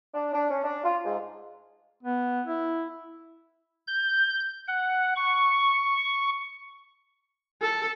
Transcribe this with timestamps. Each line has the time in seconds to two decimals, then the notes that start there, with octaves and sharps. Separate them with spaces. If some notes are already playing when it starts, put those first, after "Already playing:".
0.14 D4
0.33 D4
0.50 C#4
0.63 D4
0.84 F4
1.04 G#2
2.03 B3
2.47 E4
3.87 G6
4.67 F#5
5.16 C#6
7.62 A4